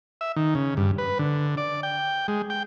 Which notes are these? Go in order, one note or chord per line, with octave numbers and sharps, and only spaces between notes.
E5
D#3
C#3
G2
B4
D3
D5
G5
G#3
G5